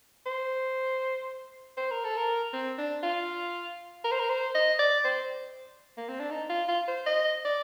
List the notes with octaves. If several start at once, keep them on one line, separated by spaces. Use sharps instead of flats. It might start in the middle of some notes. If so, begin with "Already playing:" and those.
C5
C5
A#4
A4
A#4
C4
D4
F4
A#4
C5
A#4
C5
D#5
D5
C5
A#3
C4
D4
D#4
F4
F4
C5
D#5
D5